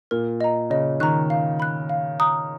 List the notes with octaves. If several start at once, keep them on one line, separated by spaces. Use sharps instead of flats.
A#2 A#4
D#5 A#5
C#3 D#5
D#3 A#5 C#6 F#6
F5
B5 F#6
F5
A#5 D#6 F#6